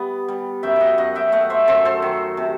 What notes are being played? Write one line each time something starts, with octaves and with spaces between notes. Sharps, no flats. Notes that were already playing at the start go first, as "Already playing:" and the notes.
Already playing: G3 B3
G3
F#2 E5 G5
D#5 F#5 G5
F#2 D#5 F#5
E5 G5
A3 D#5 F#5
C5 E5
F#2 A4 C5
A4 C5
D#3
C3